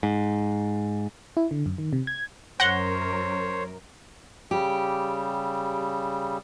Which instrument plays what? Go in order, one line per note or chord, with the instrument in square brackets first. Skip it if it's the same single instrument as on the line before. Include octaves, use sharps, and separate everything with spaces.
[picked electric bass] G#2
[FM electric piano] E4
D3
F#2
D#3
C3
G#6
[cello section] F#2 A#4 [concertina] C5 C#5 [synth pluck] F#5 [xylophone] A#6 G7
[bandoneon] C#3 G3 [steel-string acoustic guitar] G4